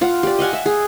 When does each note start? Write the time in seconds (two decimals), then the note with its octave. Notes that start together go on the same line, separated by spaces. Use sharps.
0.01 F4 F5 F#5
0.23 G4 D5
0.39 D#5 F5 F#5 G#5
0.53 E5
0.66 G#4